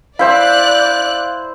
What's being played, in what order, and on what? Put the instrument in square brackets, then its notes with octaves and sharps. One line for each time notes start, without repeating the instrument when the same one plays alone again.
[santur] E4 C5 E6 [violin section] D5 F#6 [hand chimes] F5